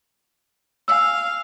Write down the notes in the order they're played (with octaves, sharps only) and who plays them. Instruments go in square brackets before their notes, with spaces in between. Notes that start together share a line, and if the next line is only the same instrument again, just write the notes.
[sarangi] F5 [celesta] G#5 E6